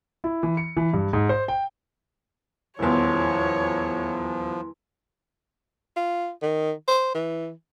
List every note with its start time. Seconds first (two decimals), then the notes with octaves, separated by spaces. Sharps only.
0.24 E4
0.43 E3
0.57 C#7
0.77 E3
0.93 G2
1.13 G#2
1.29 C5
1.48 G5
2.79 D#1 E2 F3 E4 C#5 C6
5.96 F4
6.42 D#3
6.88 C5
7.15 E3